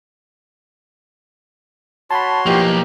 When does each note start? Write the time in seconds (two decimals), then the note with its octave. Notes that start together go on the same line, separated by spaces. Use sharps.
2.11 F#4 C#5 A5 B5 C6
2.46 B1 E3 F3 A#3 D#4 G4